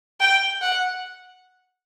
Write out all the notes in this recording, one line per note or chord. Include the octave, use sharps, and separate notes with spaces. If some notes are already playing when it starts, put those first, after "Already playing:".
G5
F#5